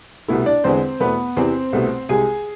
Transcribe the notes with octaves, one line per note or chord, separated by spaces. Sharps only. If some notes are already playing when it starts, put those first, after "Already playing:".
C2 B2 A3 E4
D4 D5
E2 D3 G#3 C4 C5
E2 B2 A3 B3 B4
E2 C3 E3 C4 C5
C2 B2 A3
C2 C3 G#3 G#4 G#5